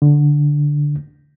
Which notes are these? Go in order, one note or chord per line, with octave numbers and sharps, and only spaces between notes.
D3